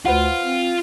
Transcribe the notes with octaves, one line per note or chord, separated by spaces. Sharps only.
D2 F4 B4 C5 F#5
C4